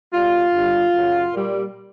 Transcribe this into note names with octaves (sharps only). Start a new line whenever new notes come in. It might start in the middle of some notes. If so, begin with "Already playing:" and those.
B2 G3 F4
G2 D3 G3
F#2 C#3 F#3
A#2 G3